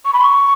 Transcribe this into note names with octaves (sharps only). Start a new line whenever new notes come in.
C#6
B5
C#6